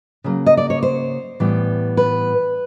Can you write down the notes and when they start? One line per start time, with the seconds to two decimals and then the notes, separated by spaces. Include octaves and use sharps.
0.24 C#3 F#3 A#3
0.46 D#5
0.57 D5
0.70 C#5
0.83 C5
1.40 A2 E3 G3 B3
1.97 B4